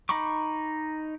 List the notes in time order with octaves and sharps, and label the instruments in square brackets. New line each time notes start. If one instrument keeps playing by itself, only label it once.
[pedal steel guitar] D#4 A#5 B5 C#6 D6